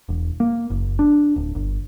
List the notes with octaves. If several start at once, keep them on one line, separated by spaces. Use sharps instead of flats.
E1
A#3
F#1
D4
D1
G1